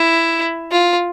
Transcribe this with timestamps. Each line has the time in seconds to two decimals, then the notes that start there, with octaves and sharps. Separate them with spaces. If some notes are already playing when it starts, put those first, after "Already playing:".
Already playing: E4
0.72 F4